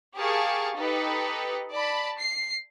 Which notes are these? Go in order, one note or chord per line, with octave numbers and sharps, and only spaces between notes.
G4 G#4 A#4 F5 A5 C#6
D#4 G4 A4 B4 D#5
D5 A5 B5
C7